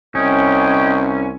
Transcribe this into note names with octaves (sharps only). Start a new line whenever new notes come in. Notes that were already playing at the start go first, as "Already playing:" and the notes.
C2 C#4 D#5 G5